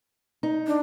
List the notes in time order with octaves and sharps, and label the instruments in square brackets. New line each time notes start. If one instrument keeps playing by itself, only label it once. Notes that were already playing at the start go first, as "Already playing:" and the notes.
[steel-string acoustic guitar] D#4
[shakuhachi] D4